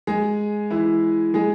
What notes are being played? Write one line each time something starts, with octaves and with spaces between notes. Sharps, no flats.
G#3 G#4
E3 E4
G#3 G#4